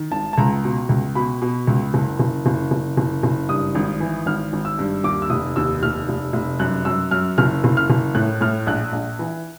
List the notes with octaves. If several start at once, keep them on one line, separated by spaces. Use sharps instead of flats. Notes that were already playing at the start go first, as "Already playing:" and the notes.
Already playing: D#3
G#1 A5
A5
C#2 A#5
B2
C#2
B2 B5
B2
C#2
F#1
F#1
F#1
F#1
F#1
F#1
G2 D#6
G#1
E3
G#1 F6
G#1
E6
G2
D#2 D6
E6
F1 D#6
D#2 E6
F1 F6
F1
F1
F#2 F#6
F#2 E6
F#2 F6
F#1 F6
F#1
F6
F#1
A2 F#6
A2 F6
A#1 F#6
A#1
E3